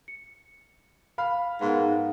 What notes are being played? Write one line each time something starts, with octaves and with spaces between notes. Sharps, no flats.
C#7
F5 B5 F6
G#2 B3 A#4 F5 F#5